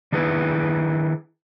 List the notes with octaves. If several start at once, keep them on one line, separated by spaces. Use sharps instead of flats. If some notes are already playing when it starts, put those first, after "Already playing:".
D#3 D4 E4 G#4 B4